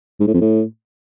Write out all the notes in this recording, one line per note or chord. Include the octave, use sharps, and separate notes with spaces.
G#2
A2
F2
A2